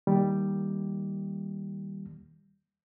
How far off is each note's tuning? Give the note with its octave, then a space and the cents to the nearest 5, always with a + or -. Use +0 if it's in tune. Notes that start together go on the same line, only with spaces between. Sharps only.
D#3 +20 G3 +0 A#3 +0